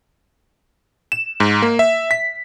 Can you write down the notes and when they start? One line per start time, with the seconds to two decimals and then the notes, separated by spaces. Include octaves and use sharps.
1.12 E7
1.40 G#2
1.62 A#3
1.79 E5
2.11 B6